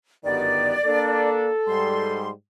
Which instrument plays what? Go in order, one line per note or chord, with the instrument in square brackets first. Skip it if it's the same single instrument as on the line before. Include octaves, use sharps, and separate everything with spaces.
[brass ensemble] G1 B3 [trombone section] F#2 D#3 G4 [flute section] D5
[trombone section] A#3 D4 [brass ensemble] A4
[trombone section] G#2 G3 [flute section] C6